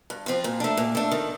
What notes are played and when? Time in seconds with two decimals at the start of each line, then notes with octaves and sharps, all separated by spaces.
0.10 G2
0.26 F3 C4 F4
0.44 A#2
0.60 A3 D4
0.77 A#2
0.95 A3 D4
1.11 D#3